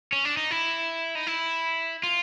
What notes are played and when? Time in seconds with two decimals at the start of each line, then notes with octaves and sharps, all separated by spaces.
0.13 C#4
0.25 D4
0.37 D#4
0.51 E4
1.15 D#4
1.27 E4
2.03 F4